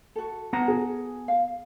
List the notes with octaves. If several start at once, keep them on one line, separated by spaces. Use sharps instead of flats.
F#4 A4
B3 F#5 A#5
G#4
F5